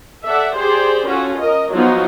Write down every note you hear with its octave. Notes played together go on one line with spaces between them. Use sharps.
A4 D5 E5 F#5
G4 G#4 C5 D5
C#4 F4 F#4 A4
A#4 D#5
F3 F#3 B3 D#4 F4 F#4